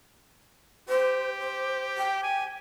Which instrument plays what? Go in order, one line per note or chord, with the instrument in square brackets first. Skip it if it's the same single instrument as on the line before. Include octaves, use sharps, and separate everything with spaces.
[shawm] G4 [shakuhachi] C5
[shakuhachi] C5
G5
[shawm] G#5